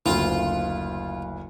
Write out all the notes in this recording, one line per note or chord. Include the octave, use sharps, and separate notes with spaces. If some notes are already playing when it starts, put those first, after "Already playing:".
F#1 D2 F4